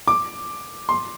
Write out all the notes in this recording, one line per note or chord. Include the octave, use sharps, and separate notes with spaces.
D6
C6